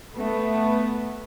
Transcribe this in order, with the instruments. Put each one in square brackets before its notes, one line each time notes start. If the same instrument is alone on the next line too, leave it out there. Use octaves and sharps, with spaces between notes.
[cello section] A3 B3